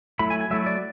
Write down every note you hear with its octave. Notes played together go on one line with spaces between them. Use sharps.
F#3 A3 E4 B5
G#5
G#5
F#3 A3 E4 E5
D5